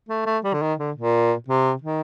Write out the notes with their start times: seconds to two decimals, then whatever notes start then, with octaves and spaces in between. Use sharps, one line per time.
0.09 A3
0.26 A3
0.44 G3
0.53 D3
0.62 D#3
0.79 D3
0.96 A#2
1.48 C3
1.82 D#3